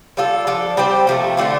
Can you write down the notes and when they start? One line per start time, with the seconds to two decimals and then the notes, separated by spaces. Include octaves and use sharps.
0.17 G3 F4 A4
0.47 F3 D4 A4
0.77 G3 C4 G4 C5
1.07 C3 F3 A3
1.37 D3 A3 D4 F4